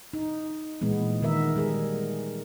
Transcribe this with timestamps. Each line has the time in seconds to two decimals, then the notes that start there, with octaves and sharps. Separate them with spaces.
0.13 D#4
0.81 A#2 E3 G#3 B3
1.22 D#3 B3 A#4 E5
1.56 G3 G#3 G#4 A#4